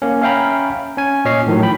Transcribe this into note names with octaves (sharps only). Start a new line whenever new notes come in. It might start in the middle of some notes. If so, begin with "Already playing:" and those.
A#3 C#4
C#4 E5 F5 G5 A#5 B5
C#4 G#5
A#2 C#4 C#5 D#5 C7
A2 D#3 F3 F#3
G5 B5